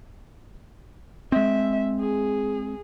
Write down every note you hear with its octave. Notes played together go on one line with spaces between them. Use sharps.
G#3 C4 E5
G#4